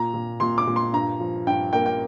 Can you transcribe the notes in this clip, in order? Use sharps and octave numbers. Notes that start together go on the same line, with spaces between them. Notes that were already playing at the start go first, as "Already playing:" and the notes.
Already playing: A#2 A#5
A#2
A#2 C6
D6
A#2
C6
G2 A#5
F3
G2 G5
A#3 G5
G5